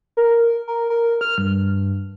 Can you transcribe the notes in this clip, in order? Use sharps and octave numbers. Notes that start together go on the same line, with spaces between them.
A#4
A#4
A#4
F6
G2